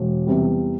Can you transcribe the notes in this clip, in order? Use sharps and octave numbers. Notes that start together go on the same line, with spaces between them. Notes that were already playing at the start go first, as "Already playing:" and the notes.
Already playing: E1
E2 C3 G3